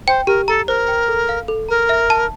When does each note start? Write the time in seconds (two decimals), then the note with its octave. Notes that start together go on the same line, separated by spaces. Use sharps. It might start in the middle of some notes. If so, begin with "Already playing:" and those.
0.07 C5 G5
0.27 G4 A#4
0.48 A4 A#5
0.68 A#4 C5
0.88 G5
1.08 A4
1.29 F5
1.48 A4
1.69 A#4 A#5
1.89 E5
2.10 A5